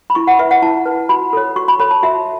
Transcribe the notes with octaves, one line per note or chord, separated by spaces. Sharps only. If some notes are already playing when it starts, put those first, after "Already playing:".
B5
E4 C#6
F#5
B4 E5
F#5
E4 A5
B4
F#4 B5
A4 C#5
F#4 C#6
B5
A4 C#5 B5
A5
F#4 E5